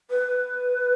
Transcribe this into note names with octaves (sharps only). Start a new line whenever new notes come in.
B4